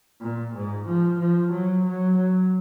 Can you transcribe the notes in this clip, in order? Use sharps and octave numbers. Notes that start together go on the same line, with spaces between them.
A#2
G#2
F3
F3
F#3
F#3
F#3